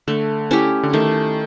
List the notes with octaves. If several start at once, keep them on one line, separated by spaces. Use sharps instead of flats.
D3 A3
C#4 E4 G4
D3
D#3 A3